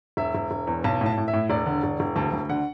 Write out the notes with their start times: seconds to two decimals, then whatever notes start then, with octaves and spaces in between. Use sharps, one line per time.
0.17 E1 E5
0.35 E1
0.51 E1
0.67 E2
0.84 B1 A5
1.01 A2
1.06 A5
1.17 A2
1.28 E5
1.33 A2
1.50 E1 D5
1.66 D3
1.83 E1
2.00 E1
2.16 D2 A5
2.33 D2
2.49 D3 F#5